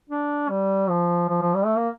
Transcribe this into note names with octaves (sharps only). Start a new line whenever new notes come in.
D4
G3
F3
F3
F3
G3
A3
A#3